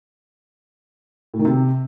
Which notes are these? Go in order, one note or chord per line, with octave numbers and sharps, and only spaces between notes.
A2
D#3
C3